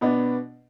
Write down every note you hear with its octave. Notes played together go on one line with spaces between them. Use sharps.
B2 B3 D4